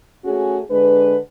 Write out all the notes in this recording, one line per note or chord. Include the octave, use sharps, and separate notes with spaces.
A3 C#4 F#4 G#4
D3 G#3 D4 B4